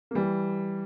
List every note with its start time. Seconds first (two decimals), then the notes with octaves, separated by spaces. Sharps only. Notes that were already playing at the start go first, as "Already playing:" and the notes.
0.11 A#3
0.15 E3 G3